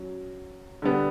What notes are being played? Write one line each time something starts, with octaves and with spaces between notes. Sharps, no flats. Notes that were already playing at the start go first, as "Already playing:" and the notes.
Already playing: F#3 C#4
D3 G3 B3